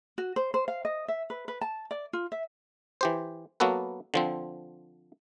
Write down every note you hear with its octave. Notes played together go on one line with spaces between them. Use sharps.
F#4
C5
C5
F5
D#5
E5
B4
B4
A5
D5
F4
E5
E3 G4 C5
F#3 A#3 B3 F#4 A4 B4
D3 F3 C4